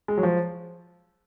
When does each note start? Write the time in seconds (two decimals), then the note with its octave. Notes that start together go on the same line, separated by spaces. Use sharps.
0.08 G#3
0.18 F#3
0.23 F3